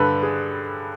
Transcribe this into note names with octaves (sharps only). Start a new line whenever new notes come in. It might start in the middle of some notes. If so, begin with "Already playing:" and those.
Already playing: G2 D3 A4 B4
G#4